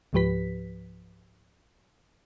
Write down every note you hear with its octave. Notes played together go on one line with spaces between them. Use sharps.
C#2 G#2 F3 G4 B4 B6